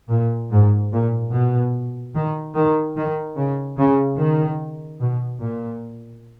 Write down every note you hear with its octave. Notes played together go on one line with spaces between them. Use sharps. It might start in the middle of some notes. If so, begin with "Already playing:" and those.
A#2
G#2
A#2
B2
D#3
D#3
D#3
C#3
C#3
D#3
B2
A#2